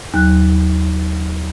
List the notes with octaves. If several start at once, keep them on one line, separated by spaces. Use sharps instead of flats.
D#2 F#3 F#6